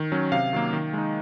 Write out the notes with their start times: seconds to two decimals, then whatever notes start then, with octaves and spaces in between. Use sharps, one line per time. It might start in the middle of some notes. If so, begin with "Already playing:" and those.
Already playing: D#3
0.12 F#3 C#4
0.32 C3 F5
0.53 D#3 F#3 A#3
0.73 D#3
0.93 G#3 D#4